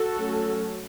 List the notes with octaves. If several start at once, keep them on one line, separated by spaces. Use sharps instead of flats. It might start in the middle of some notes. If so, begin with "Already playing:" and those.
Already playing: F#4 A4
F#3 A3 C#4